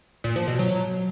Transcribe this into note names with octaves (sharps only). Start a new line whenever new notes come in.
A#2
F3
B2
F#3